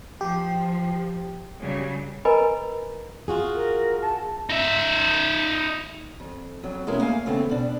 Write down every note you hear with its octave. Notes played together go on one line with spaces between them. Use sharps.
F3 G4
C#3 F#3 G3
A#4 B4 D#5 G#5 A#5 B5
F4 F#4 G#4
A#4
A5
D#4 E5
F2
F2 F#3
B2 G#3 B3 C#4 E4 A#4
A3 A#3 F5 G#5
C#3 E3 A3 B3 C4
B2 D4